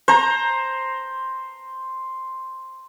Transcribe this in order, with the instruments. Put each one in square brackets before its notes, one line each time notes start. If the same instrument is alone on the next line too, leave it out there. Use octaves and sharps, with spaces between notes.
[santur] C5 A#5